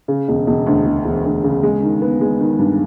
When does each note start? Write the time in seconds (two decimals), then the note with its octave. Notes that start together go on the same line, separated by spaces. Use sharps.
0.08 C#3
0.28 E1
0.47 E1
0.67 D2
0.86 E1
1.05 E1
1.25 D2
1.44 C#3
1.63 G#3
1.83 D#3
2.02 B3
2.21 G#3
2.41 D#3
2.59 G2